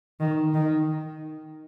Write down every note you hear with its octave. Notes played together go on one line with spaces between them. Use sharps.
D#3
D#3